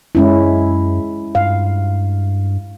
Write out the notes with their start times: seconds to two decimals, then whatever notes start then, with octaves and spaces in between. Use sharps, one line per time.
0.15 F#2 G#3 C#4 E4
1.35 G2 F5